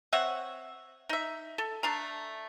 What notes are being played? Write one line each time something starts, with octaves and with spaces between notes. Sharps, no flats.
C4 C#5 E5 F#5
D#4 E5
A4
A3 D4 A#5